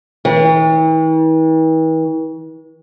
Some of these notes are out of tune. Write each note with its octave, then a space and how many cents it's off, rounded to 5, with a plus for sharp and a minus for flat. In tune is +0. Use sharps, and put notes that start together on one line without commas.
E3 -45